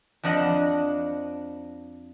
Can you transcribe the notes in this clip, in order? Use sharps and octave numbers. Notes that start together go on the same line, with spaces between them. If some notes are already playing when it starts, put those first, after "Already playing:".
F2 F3 D4 D#5 F#5